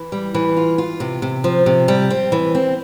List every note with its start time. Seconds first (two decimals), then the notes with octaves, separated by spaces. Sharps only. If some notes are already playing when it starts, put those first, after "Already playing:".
Already playing: E3
0.12 G3
0.34 E3
0.57 F4
0.78 F4
1.00 C3
1.22 C3
1.44 F3
1.66 C3
1.88 G3
2.10 C4
2.32 E3
2.55 C4